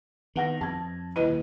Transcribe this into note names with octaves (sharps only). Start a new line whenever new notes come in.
D#3 B3 F#5 A#6
F2 A5 G#6
D#1 E4 B4 D#5 D#7